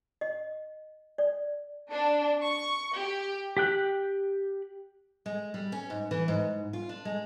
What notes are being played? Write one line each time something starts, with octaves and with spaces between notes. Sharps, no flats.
D#5
D5
D4
C#6
G4
G4 G5 F#6
G#3
G3
C#4
G#2
E3
G#2
F4
D4
G#3